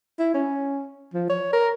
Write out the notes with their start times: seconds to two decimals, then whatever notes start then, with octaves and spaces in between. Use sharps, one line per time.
0.19 E4
0.34 C#4
1.14 F3
1.30 C#5
1.53 A#4